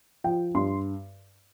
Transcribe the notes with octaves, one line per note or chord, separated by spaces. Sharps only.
F3 G5
G2 C6